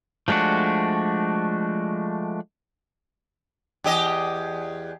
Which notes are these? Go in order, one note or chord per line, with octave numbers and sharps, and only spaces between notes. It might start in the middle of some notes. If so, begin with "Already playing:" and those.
F3 G#3 A3 D4 F#4
E2 G4 D#5